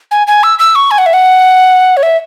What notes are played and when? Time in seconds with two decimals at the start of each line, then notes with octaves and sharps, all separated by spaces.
0.11 G#5
0.27 G#5
0.43 E6
0.59 E6
0.75 C#6
0.91 G#5
0.98 F#5
1.06 E5
1.13 F#5
1.97 C#5
2.03 E5